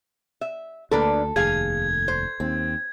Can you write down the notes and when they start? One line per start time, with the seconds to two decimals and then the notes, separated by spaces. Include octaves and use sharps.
0.41 E5
0.91 D2 A#3 D4 A4 B4
1.36 F1 D#2 G#4 F5 G#5 G#6
2.08 C5
2.40 D#2 C4